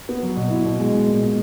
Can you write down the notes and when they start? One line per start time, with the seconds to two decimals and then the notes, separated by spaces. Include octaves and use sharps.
0.09 B3
0.23 F#3
0.37 B2
0.50 E4
0.65 B2
0.79 G#3
0.93 G#3
1.07 A#2
1.22 A#2